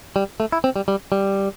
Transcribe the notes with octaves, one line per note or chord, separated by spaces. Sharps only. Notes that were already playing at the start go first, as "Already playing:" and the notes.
G3
A3
E4
C4
G3
G3
G3